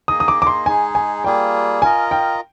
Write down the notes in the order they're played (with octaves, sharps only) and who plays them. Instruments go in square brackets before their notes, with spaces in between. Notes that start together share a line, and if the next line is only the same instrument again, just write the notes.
[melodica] A#3 D#4 G#4 D#5 [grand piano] D#6
[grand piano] D#6
D6
D6
C6
[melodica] G#3 D#4 G#4 [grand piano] G#5
[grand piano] G#5
[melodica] G3 A#3 F4 G#4 [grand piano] G5
[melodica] F4 A#4 D#5 [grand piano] G#5
[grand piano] G5